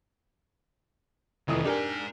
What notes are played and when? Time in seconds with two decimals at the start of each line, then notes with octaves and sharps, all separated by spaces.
1.48 F1 D#3 E3 A3 D#6
1.65 D4 D#4 G4 A#4 G#5